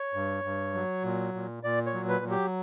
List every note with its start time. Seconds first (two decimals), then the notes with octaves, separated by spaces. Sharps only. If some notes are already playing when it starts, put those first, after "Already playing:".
Already playing: C#5
0.14 G2
0.44 G2
0.74 F#3
1.04 A#2
1.34 A#2
1.63 A#2 D5
1.86 C#5
1.94 F#3
2.09 B4
2.24 F#3
2.31 G4